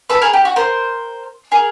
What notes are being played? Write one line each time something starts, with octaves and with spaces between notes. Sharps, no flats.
A4 B4
G#4 A#4
G4
F#4
A#4 C5
G#4 A#4